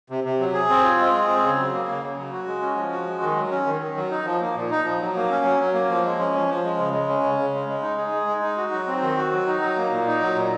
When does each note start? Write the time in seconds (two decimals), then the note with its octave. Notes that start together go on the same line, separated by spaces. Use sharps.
0.10 C3
0.24 C3
0.40 F#3
0.54 G#4
0.69 C4
0.84 F4
0.99 G#3
1.14 G#4
1.28 C4
1.43 C#3
1.58 F#3
1.73 A#3
1.88 C#3
2.03 C#3
2.18 F#3
2.33 F#4
2.47 G#3
2.62 C#4
2.77 F3
2.92 F#4
3.07 G#3
3.22 D#3
3.37 F#3
3.51 C#4
3.66 D#3
3.81 D#3
3.96 F#3
4.11 D#4
4.25 F3
4.41 A#3
4.55 A#2
4.71 D#4
4.85 F3
5.01 F#3
5.16 A#3
5.30 C#4
5.45 F#3
5.60 F#3
5.74 A#3
5.89 F3
6.05 G#3
6.19 C#4
6.35 F3
6.49 F3
6.64 G#3
6.79 C#3
6.93 G#3
7.09 C#4
7.23 C#3
7.39 C#3
7.53 G#3
7.68 G#3
7.82 D#4
7.98 G#4
8.12 G#3
8.27 G#3
8.42 D#4
8.57 F#4
8.72 F#3
8.87 C4
9.02 D#3
9.17 F#4
9.31 F#3
9.47 D#4
9.62 F#3
9.77 A#3
9.91 A#2
10.07 D#4
10.21 F#3
10.36 A#2